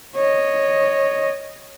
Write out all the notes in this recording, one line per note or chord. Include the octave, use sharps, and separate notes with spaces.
C#5 D#5